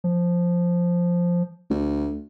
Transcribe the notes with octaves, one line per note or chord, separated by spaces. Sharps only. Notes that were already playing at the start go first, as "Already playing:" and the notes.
F3
D2